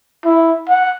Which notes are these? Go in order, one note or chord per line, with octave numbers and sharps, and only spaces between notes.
E4
F#5